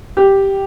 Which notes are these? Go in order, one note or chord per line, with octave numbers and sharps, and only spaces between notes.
G4